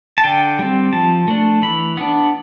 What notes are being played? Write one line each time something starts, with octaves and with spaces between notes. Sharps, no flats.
A5
D3 G5
G3 C4
F3 A5
A3 D4
E3 B5
B3 D4